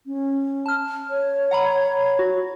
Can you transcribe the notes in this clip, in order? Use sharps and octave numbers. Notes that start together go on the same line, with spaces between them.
C#4
A5 F6
C#5
F#5 A#5 B5
F#4